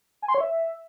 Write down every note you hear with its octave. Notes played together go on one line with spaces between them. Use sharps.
G#5
C6
C#5
E5